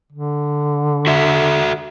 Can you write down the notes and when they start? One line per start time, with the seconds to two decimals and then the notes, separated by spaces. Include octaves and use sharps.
0.12 D3
1.07 F#4 A4 E5